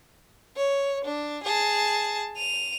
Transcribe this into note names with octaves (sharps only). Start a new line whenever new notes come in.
C#5
D4
G#4 A5
D#7 F7